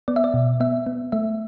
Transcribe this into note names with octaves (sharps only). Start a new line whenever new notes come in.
B3 D5
E5
D5
B2
B3 E5
B3
A3 E5